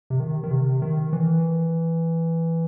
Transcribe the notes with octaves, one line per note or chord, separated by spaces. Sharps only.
C3
D#3
D#3
C3
D#3
E3